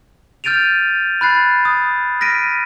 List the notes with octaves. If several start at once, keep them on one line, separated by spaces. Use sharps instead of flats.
F6 G6 A6 D7 D#7 F7
B5 F#6 A6 C7
D#6
F6 A#6 B6 D7 D#7